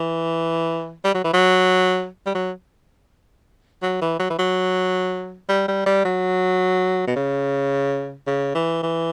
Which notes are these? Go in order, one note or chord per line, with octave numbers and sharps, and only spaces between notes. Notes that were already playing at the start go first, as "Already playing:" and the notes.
Already playing: E3
G3
F#3
E3
F#3
G3
F#3
F#3
E3
F#3
E3
F#3
G3
G3
G3
F#3
B2
C#3
C#3
E3
E3